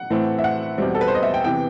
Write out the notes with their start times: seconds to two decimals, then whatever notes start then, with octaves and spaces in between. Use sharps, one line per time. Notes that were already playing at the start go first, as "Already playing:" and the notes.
Already playing: F#5
0.10 A2 E3 A3 C4
0.39 E5
0.44 F#5
0.78 E2 B2 G3 C4
0.95 A4
1.01 B4
1.08 C5
1.15 D#5
1.23 E5
1.34 G5
1.44 C3 E3 B3 G5